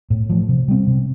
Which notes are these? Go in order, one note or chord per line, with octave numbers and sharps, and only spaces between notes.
A2
F3 A3
C3
G3 C4
C3